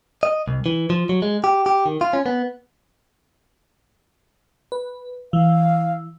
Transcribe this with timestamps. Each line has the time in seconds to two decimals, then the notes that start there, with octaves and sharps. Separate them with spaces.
0.23 D#5
0.48 C2
0.66 E3
0.90 F3
1.09 F#3
1.22 G#3
1.44 G4
1.66 G4
1.86 D#3
2.01 F4
2.13 C#4
2.26 B3
4.72 B4
5.33 E3 F5